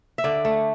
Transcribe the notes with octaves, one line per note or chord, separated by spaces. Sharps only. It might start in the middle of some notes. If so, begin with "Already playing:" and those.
E5
D3 D5
A3